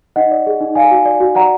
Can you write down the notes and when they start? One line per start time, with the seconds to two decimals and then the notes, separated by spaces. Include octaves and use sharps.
0.16 D#4 D#5 F#5
0.31 D5
0.46 G#4
0.61 D#4
0.75 D5 F5 G#5
0.91 F#4
1.05 D5
1.20 F#4
1.35 D5 F#5 A#5